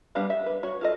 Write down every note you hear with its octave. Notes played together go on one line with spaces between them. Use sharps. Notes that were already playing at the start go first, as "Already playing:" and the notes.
G3 B3 D4 F5
E5
B4
F#4 C#5
F4 A4 D#5